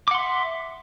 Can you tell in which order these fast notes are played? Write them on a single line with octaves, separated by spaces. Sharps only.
D6 F#5 C6 E5